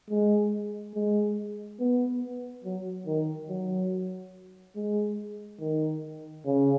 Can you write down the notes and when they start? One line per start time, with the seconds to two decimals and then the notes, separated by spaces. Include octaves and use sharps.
0.10 G#3
0.95 G#3
1.80 B3
2.64 F#3
3.07 D#3
3.49 F#3
4.76 G#3
5.60 D#3
6.45 C#3